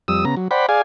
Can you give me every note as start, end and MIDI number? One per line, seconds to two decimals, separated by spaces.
0.08 0.25 41
0.08 0.25 55
0.08 0.25 87
0.08 0.25 88
0.25 0.35 49
0.25 0.35 59
0.25 0.35 82
0.37 0.48 54
0.51 0.66 72
0.51 0.66 74
0.51 0.66 78
0.51 0.66 79
0.51 0.66 83
0.69 0.82 68
0.69 0.82 74
0.69 0.82 77
0.69 0.82 80